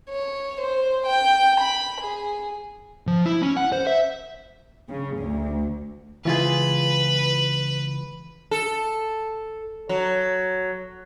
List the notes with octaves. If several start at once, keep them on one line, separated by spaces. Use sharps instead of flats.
C#5
C5
G5
B5
G#4
F3
E4
C#4
F#5
C5
E5
C#3
D2
C#2 E3 F4 G#4 B4
A4
F#3